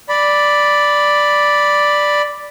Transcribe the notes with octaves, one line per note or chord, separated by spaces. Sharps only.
D5 B5